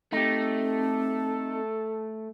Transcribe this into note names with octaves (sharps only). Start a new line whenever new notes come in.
A3 C4 D#4 G4 A4